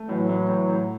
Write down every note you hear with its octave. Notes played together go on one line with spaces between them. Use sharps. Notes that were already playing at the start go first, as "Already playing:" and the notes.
Already playing: A3
A2 E3 F#3
A2
A2
A2